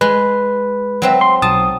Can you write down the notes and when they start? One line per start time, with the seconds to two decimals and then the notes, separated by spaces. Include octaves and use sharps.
0.01 G#3 B4
1.02 F#3 C4 E5
1.21 C6
1.42 B1 A5 D#6